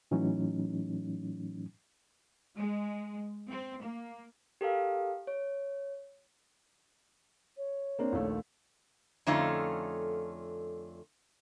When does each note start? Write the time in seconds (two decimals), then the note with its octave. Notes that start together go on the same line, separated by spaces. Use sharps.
0.11 A2 E3 F#3 A3 C#4 D#4
2.57 G#3
3.47 C4
3.79 A#3
4.61 G4 A4 A#4 F5
5.27 C#5
7.57 C#5
7.99 A#3 C4 D4
8.12 A#1 D#2 A3
9.26 F2 D3 A3 C#4 D#4 F4